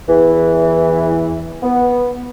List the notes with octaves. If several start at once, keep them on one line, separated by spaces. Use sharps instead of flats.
E2 E3
B3